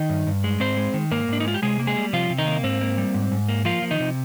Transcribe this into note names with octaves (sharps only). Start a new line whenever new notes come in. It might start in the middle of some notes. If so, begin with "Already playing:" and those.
Already playing: D#3 D#4
G2
G2
G#3
G#2 C4 C5
G#3
D#3
G#2 A#3 A#4
G#2 D4
D#4
G#3 F4
G4
C3 G#3 G#4
A#3
G#3 G#4
G3
C3 F3 F4
C3
D#3 D#4
A#3
G#2 C4
A#3
G3
G#2
G#2
A#3
F3 A#3 F4
F3
D#3 D#4
C3